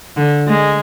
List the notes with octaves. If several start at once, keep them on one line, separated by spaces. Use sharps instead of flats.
D3
G#3